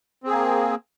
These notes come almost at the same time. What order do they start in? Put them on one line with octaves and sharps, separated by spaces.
C4 G#4 A#3